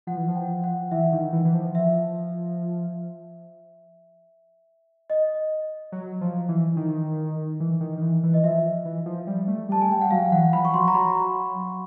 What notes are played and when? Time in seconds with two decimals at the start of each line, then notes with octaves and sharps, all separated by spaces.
0.07 F3 F#5
0.17 E3
0.28 F3
0.35 G5
0.64 F#5
0.91 E3 E5
1.12 D#3
1.33 E3
1.45 E3
1.54 F3
1.75 E5
5.10 D#5
5.92 F#3
6.21 F3
6.49 E3
6.77 D#3
7.60 E3
7.80 D#3
7.97 D#3
8.02 E3
8.23 E3
8.34 D#5
8.44 F3 E5
8.85 E3
9.06 F3
9.27 G3
9.48 A3
9.69 G3 A5
9.82 G#5
9.90 G3 G5
10.01 F#5
10.11 F#3 F5
10.31 E3 F#5
10.52 F3 B5
10.65 C#6
10.74 F#3 C6
10.88 A#5
10.95 F#3 B5